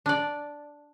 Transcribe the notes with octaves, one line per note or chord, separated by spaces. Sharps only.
D4 D5